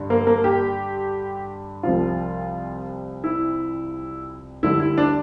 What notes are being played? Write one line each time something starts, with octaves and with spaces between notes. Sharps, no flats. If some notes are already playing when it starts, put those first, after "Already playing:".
Already playing: G2 D3
A#3
A#3
G4
C2 C3 F3 F4
E4
D2 D3 G3 E4
E4
D4